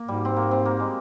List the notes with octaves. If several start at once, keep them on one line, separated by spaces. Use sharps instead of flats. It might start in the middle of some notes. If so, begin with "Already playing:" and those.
Already playing: A#3
G#2 G3
C4
A#3
C4
A#3
G#3